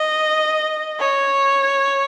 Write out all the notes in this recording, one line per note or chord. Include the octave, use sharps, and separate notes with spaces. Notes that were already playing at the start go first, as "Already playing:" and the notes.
Already playing: D#5
C#5